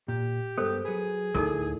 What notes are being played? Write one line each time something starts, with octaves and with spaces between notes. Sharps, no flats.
A#2 G4
G2 G#3 B3 A4 A#4 C5
F#3 G#4 B4
D2 A2 D#4 E4 A4 A#4 D5